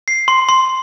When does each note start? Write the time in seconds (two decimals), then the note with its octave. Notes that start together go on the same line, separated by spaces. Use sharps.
0.08 C7
0.28 C6
0.49 C6